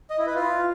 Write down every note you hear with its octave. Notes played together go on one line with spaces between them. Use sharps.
D#5
E4
B4
F4